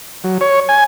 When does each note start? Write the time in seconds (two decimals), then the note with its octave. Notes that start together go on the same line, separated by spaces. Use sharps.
0.24 F#3
0.41 C#5
0.69 G#5